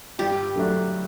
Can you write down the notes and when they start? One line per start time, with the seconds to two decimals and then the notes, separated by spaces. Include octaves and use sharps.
0.18 G2 G4
0.56 D3 F#3 A3 D4